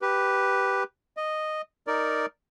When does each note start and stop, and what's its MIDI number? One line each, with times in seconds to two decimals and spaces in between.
0.02 0.83 67
0.02 0.83 71
1.17 1.62 75
1.87 2.26 63
1.87 2.26 70
1.87 2.26 74